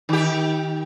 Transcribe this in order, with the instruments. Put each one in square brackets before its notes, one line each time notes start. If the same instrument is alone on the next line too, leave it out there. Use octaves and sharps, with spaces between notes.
[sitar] D#3 G4